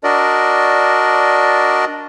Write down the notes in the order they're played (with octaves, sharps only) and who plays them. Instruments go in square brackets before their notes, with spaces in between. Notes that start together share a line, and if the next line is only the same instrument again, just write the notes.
[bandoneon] D4 F#4 A#4 D5 D#5